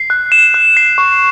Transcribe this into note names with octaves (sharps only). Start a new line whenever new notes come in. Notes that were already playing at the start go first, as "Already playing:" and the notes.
Already playing: C7
F#6
E7
F#6
C7
C#6